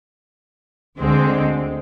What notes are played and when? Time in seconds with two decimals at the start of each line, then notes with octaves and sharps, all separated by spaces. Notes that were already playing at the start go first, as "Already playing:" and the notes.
0.98 D2 D3 G#3 C4